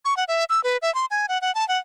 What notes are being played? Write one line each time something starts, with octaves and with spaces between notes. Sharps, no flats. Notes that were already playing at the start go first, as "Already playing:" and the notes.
C#6
F#5
E5
E6
B4
E5
C6
G#5
F#5
F#5
A5
F#5